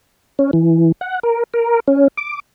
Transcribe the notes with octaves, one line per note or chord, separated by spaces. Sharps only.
C#4
E3
F#5
A#4
A#4
C#4
D6